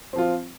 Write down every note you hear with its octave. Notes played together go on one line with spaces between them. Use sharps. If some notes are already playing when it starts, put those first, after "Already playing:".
F3 C4 F4